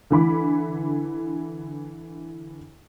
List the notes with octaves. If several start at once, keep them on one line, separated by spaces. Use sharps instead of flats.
D3 E3 B5 D6